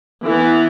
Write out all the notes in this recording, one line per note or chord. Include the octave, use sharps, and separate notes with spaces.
E3 B3